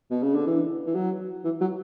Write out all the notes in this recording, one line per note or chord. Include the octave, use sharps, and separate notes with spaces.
B2
C#3
D3
E3
E3
F#3
E3
F#3